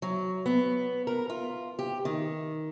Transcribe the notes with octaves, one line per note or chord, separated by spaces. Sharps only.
F#3
B3
A#4
F4
G4
D#3